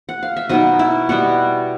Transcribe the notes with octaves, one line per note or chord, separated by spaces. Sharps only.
F#5
F5
E5
B2 F#3 B3 D#4 D#5
E4 E5
B2 G3 B3 F#4 F#5